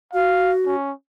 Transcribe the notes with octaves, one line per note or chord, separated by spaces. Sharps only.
F#4 F5
C#4